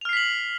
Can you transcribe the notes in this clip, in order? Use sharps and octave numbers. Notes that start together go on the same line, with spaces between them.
F6 B6 C7 F7 F#7